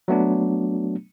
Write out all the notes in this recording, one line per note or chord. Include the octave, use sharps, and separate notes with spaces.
F#3 A3 B3 D4